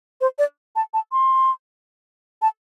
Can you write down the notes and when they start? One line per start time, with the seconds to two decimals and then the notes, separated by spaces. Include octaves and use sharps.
0.21 C5
0.39 D5
0.76 A5
0.94 A5
1.12 C6
2.42 A5